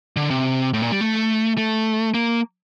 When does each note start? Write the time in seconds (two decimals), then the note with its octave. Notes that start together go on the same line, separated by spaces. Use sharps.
0.17 D3
0.30 C3
0.74 A2
0.82 A#2
0.92 G3
1.01 A3
1.58 A3
2.14 A#3